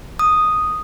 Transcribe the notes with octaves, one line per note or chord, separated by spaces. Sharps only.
D#6